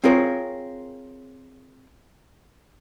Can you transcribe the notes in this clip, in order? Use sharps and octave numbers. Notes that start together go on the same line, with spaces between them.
C4 F4 G#4 A#4 C#5